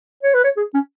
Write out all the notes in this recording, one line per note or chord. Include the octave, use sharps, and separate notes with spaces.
C#5
B4
C#5
G#4
C#4